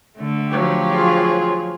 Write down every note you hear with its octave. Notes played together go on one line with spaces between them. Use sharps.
D3 A3
F3 F#3 G4
F4 G#4